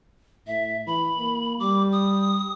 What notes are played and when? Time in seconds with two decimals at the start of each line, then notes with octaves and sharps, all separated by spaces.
0.47 A2 E5
0.87 E3 B5
1.19 A#3
1.60 G3 D6
1.92 D#6